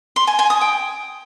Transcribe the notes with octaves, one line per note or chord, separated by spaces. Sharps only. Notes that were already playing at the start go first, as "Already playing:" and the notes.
C6
G#5
G#5
D#6
G5